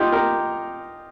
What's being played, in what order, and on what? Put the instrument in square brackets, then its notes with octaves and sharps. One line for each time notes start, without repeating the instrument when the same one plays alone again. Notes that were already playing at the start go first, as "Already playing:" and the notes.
Already playing: [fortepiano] D#4 F4 G4
G4 A#4